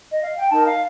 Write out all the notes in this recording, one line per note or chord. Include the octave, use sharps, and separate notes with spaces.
D#5
F5
G5
D#4 A#4 A5
F5